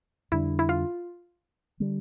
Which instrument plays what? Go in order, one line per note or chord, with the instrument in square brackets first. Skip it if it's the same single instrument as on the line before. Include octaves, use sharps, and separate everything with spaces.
[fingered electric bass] F2 D3 G3 D4 [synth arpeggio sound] E4
[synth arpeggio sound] E4
F4
[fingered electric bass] D3 G3